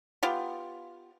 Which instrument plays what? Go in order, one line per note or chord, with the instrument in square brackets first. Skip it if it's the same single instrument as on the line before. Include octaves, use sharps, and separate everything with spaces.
[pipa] B3 F4 G4